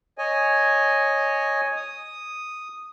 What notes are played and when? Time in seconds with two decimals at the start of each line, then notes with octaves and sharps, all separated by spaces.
0.18 C#5 D#5 G#5
1.76 D#6